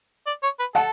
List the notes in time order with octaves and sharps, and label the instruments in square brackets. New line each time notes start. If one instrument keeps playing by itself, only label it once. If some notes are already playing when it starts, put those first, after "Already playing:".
[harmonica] D5
C#5
B4
[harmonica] A4 [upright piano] F#5 A5